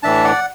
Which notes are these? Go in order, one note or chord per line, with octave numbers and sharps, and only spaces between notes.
A2 E3 D4 E5 A5
D5 F#5